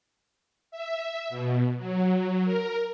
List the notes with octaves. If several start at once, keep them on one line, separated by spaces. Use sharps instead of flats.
E5
B2
F#3
A#4